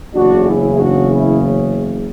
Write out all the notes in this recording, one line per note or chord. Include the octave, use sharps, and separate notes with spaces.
F#1 E2 C#3 D4 F#4
E4 G#4
D4 F#4
C#4 E4